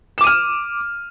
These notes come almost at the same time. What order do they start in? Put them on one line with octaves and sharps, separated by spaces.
E7 D6 D#7 F6